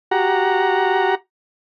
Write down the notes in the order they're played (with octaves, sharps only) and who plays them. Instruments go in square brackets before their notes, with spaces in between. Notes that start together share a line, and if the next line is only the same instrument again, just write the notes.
[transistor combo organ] F#4 G4 F#5 A#5